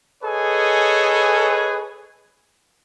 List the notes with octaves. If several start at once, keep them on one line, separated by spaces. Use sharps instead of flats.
G#4 A4 B4 C#5 D#5 G#5